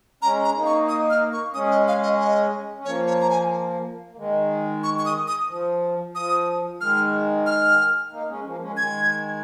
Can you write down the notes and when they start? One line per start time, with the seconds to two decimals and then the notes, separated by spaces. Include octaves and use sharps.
0.22 G#3 C#4 A#5
0.44 A#5
0.55 A#3 D#4
0.66 C#6
0.88 D#6
1.10 F6
1.32 C#6
1.54 G#3 C#4 D#6
1.71 D#5
1.88 F5
2.03 D#5
2.20 D#5
2.77 C#4
2.85 F3 A#3 C#5
3.07 C#5
3.21 A#5
3.30 G#5
4.11 A#3
4.17 D#3 G#3
4.83 C#6
4.99 C#6
5.05 D#6
5.27 D#6
5.49 F3
6.14 F3 D#6
6.80 D#3 G#3 F6
7.46 F6
8.11 A#3 D#4
8.29 G#3 C#4
8.45 F3 A#3
8.60 G#3 C#4
8.77 D#3 G#3 G#6